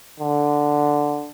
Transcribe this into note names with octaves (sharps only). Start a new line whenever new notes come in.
D3